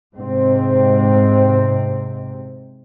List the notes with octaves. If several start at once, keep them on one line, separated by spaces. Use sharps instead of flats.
G#2 C3 C4